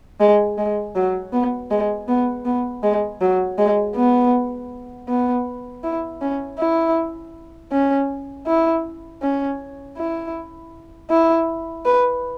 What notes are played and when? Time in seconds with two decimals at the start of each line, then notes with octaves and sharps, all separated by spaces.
0.20 G#3
0.58 G#3
0.95 F#3
1.33 B3
1.71 G#3
2.08 B3
2.46 B3
2.83 G#3
3.21 F#3
3.58 G#3
3.96 B3
5.08 B3
5.84 E4
6.21 C#4
6.59 E4
7.72 C#4
8.47 E4
9.22 C#4
9.97 E4
11.10 E4
11.85 B4